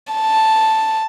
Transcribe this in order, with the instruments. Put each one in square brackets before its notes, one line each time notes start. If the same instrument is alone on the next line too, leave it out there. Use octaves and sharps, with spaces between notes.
[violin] A5